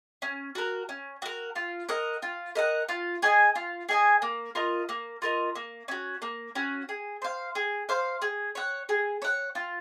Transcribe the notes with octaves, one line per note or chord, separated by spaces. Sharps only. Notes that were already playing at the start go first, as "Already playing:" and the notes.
C#4
F#4 A#4
C#4
F#4 A#4
F4
A#4 D#5 F#5
F4
A#4 D#5 F#5
F4
G#4 D#5 G#5
F4
G#4 D#5 G#5
A#3
F4 A#4 D#5
A#3
F4 A#4 D#5
A#3
C#4 F#4
A#3
C#4 F#4
G#4
C5 F5
G#4
C5 F5
G#4
C#5 F#5
G#4
C#5 F#5
F4